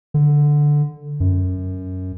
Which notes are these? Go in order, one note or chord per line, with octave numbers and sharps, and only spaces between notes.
D3
F#2